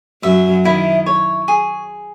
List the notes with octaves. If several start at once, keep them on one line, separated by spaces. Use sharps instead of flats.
F#2 F#3 E5
D#3 E4
C#5
G#4